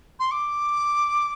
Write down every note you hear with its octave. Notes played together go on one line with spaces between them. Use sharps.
C6
D6